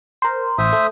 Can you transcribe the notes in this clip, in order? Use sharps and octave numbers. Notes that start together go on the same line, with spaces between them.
A#4 C5
A1 C5 E5 D#6
A3